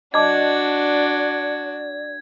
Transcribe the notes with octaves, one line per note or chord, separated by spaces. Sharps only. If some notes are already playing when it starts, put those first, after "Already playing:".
D4 F#4 D5 D#5 A5 D6 G#6